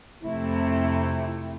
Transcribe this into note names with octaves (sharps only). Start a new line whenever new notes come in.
F2 C3 A3 E4